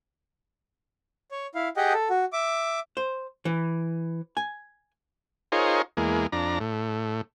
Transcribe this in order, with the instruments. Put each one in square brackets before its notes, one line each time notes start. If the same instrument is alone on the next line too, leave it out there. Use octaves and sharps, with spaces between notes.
[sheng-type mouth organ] C#5
E4 F5
G4 G#4 D#5 F#5 G5
A4
F#4
E5 D6
[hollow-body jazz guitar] C5
E3
G#5
[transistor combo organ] D#4 F4 G#4 A#4 C5 C#5
E2 G#3 A#3
F2 D4 A#5
A2